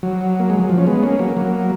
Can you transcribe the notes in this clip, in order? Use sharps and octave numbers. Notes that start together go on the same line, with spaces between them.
F#3
A#3
G#3
F#3
F3
C#4
G#3 B3
A#3 C#4
F#3 A#3
F#3 A#3